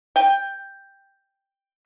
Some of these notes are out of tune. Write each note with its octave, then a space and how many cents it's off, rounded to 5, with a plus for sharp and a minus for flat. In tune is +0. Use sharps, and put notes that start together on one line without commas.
G5 +5